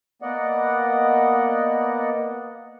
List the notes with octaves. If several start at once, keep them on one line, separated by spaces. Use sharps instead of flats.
A#3 B3 D5 D#5 F#5